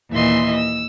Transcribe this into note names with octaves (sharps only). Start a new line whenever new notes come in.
D#2 A#2 E3 D#5 E5 C6
E6